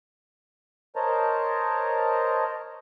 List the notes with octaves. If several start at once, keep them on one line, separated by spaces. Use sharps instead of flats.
A#4 C5 C#5 D#5 A5 A#5